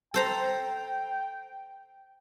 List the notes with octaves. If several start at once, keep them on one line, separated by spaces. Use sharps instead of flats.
A4 C5 G5 A#5